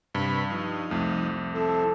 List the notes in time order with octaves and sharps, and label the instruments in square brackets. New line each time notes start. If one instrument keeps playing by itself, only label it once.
[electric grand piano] G2 [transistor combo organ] C3 B4 B5
[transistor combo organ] F3 D#4
[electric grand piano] C2 F2 A3
[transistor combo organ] C4 E4 [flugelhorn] A4